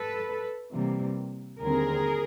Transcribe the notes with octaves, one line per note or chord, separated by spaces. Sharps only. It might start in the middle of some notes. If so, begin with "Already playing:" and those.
Already playing: A4 B4
C3 E3 G3 A#3
D#2 D3 G3 C4 G#4 A#4